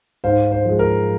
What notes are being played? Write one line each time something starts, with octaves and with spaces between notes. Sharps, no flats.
G#2 C5 F5
C5
F3 G#3
A#4